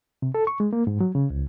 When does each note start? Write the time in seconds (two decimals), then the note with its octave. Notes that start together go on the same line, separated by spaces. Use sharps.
0.22 C3
0.35 A4
0.47 C#6
0.60 G#3
0.73 A#3
0.87 G#2
1.01 F#3
1.15 C#3
1.30 C#2